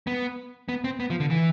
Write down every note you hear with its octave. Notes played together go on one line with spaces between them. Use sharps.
B3
B3
C4
B3
F3
D3
E3